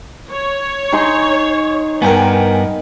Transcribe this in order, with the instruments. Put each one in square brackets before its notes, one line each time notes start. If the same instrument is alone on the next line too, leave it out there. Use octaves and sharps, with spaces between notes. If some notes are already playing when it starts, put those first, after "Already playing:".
[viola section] C#5
[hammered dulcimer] D#4 G#4 C6
[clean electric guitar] G2 B3 [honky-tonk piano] A#4 G5 G#5